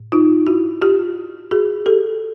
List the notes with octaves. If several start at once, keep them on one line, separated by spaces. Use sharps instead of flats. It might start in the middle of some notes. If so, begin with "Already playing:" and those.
Already playing: A2
D#4 F4
E4 F#4
F4 G4
F#4 G#4
G4 A4